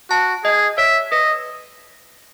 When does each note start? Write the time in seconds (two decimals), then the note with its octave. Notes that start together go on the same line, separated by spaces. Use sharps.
0.10 F#4 A5
0.44 G#4 D#5
0.78 C#5 E5
1.11 B4 D#5